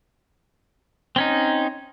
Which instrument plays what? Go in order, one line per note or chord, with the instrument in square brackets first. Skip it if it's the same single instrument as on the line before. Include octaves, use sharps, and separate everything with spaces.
[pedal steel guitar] C4 C#4 D#4